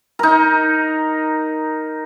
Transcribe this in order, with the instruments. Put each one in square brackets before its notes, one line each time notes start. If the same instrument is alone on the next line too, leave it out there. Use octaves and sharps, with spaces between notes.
[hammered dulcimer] D#4 A#4